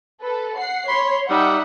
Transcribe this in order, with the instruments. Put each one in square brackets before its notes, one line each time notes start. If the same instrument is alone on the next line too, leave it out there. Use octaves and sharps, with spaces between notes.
[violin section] A4 B4
F#5 C7
[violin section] C#5 [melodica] B5 [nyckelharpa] C6
[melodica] G3 [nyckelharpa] D#4 E5 [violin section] F#5